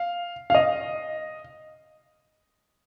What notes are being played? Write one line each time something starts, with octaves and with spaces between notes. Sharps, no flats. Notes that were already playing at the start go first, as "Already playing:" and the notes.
Already playing: F5
F5
D#5